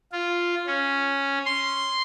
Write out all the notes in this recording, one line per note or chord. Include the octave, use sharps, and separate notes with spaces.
F4
C#4
C6